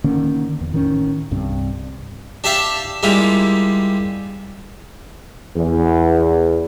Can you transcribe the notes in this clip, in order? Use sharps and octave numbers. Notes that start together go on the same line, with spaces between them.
D3 D#3 A#3 C#4
E2
A1 D#3 A#3 C#4
C2 G2 C4
D4 G4 D5 E5 F5 A5
G3 G#3 A#3 E4 F4 G4
E2